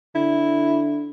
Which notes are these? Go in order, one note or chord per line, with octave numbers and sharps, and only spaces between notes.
D3 E4